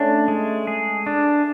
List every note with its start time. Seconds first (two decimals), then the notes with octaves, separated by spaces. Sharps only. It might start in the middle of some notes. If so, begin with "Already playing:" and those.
Already playing: A3 C#4 D4 E4
0.28 G#3
0.67 G#4
1.06 D4